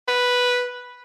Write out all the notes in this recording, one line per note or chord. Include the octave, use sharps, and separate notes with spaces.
B4